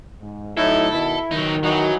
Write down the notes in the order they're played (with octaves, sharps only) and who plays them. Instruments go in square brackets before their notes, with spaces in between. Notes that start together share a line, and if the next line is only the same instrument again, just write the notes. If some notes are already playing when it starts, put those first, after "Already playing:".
[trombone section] G#2
[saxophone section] A2 E4 [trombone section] F#3 D#4 [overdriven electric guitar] A4
[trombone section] B2 D#3 [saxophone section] E4
[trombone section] D#3 [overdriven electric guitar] F#3 D#4
[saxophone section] E3 D#4 F#4 [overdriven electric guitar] F#3